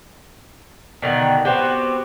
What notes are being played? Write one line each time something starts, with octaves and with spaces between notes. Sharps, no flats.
B2 D3 D#3
B3 C4 F#4 G4